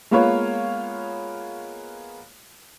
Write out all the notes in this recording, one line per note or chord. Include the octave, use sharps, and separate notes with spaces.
G#3 A#3 B3 F4 B4 C#5